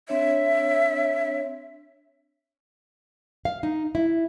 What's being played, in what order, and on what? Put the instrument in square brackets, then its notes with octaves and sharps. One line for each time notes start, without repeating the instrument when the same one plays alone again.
[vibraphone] C4 D4 C#5 [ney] E5
[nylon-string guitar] F5
D#4
E4